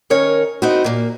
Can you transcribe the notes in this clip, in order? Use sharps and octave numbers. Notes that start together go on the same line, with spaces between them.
D#3 C#4 A#4 C#5
C4 D#4 E4 F#4
A#2 A#3